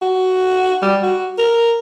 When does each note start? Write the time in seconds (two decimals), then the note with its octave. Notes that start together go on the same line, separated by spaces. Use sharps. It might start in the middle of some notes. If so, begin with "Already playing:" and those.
0.02 F#4
0.82 G3
1.03 F#4
1.38 A#4